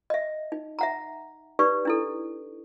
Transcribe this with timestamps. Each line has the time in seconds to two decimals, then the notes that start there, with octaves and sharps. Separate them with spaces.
0.10 D#5 E5
0.52 D#4
0.79 E5 F#5 A#5
1.59 D#4 G4 B4 D5 C#6
1.85 D4 E4 A4